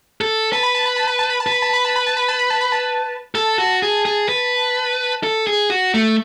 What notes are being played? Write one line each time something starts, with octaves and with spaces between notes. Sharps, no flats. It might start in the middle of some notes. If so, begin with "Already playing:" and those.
A4
B4 A5
B5
A5
B5
A5
B5
A5
B5
A5
B4
B5
A5
B5
A5
B5
A5
B5
A5
B5
A5
B5
A5
A4 A5
F#4
G#4
G#4
B4
A4
G#4
F#4
A3